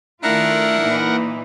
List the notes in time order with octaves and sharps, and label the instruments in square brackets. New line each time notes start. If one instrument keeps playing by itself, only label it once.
[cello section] D#3 A3 F4 [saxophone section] D4 E4 [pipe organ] A#4 F#5 A#5
[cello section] A#2 E3 D#4